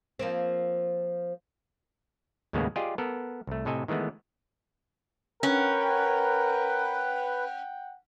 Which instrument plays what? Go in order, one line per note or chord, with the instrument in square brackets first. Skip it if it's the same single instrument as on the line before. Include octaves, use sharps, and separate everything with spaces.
[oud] F3 A#3 C4
[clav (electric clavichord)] D#2 A2 C#3 G#3 A#3 B3
F4 G4 G#4 D5 D#5
B3 A4 A#4
C2 A3
A2 C3 A4 D#5 G#5
D#3 E3 G#3 A3 B3
[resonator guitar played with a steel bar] C#4 [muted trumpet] A#4 [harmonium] B4 [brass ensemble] F#5 G5